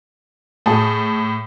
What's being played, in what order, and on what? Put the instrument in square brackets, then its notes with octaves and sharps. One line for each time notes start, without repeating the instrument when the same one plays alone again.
[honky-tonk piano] A2 [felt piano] G#4 A5